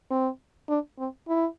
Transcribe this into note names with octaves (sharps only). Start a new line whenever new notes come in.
C4
D4
C4
E4